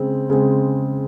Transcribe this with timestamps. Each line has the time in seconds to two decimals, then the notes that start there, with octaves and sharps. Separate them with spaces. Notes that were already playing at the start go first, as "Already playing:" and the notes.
Already playing: C#3 G#3 C4
0.30 C#3 G#3 C4